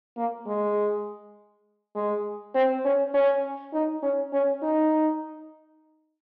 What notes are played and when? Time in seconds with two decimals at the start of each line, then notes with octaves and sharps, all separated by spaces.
0.17 A#3
0.47 G#3
1.95 G#3
2.55 C4
2.85 C#4
3.14 C#4
3.73 D#4
4.03 C#4
4.33 C#4
4.63 D#4